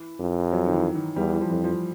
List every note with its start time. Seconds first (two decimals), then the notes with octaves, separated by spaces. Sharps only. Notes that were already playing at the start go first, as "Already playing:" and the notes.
Already playing: E3
0.20 F2
0.52 F#3
0.66 D#3
0.74 E3
0.95 D#3
1.16 E2 G3
1.33 E3
1.41 F3
1.49 F2 E3
1.64 F3